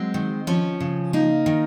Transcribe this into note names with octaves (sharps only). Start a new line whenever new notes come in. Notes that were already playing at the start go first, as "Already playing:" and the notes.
Already playing: F#3 G#3 C4
D#3
F3 C#4
C#3
A#3 D#4
D#3